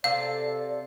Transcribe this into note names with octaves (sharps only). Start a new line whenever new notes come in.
C3 A4 D5 F5